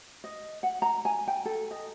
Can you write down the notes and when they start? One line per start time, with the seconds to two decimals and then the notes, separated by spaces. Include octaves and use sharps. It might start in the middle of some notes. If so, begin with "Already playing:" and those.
0.24 D#5
0.63 F#5
0.82 A#5
1.05 G#5
1.28 G5
1.45 A4
1.71 D#5